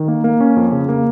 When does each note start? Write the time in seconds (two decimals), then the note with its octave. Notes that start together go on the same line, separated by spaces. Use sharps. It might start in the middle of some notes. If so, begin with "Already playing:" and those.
Already playing: D#3
0.08 A#3
0.24 A#3
0.40 C#4
0.56 F2
0.72 C#3
0.89 A#3